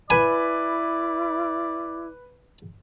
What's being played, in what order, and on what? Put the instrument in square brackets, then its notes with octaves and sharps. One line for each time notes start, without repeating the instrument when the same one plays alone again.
[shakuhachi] E4 [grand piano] B4 B5 [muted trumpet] D5 [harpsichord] G#5